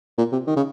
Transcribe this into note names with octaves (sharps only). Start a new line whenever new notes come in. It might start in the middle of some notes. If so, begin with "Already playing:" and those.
A#2
C3
D#3
C#3